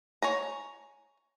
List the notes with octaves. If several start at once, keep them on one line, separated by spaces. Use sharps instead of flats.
C#5 G#5 A#5